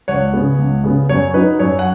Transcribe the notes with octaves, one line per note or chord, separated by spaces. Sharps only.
C#2 C#5 F#5
C#3 B3
C#2
C#3 B3
F#2 C#5
F#3 D#4 B4
F#2 C#5
F#5